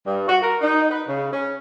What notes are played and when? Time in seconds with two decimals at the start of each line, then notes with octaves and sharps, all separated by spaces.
0.06 G2
0.28 F#4
0.42 A#4
0.62 D#4
0.90 B4
1.08 C#3
1.33 C#4